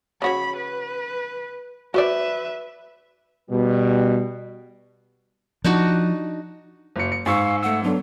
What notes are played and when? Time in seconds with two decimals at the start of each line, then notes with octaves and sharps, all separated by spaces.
0.22 C#3 F#4 C#5 B5
0.56 B4
1.94 F#4 B4 C5 D5 E5
3.50 B2 G3
5.65 F3 D4 D#4 F#4
6.96 F#1 C#7
7.12 C#7
7.26 G#2 F5 G#5 C#6 E6
7.63 A3 F#5 E6
7.83 F#3 B3 D4 A4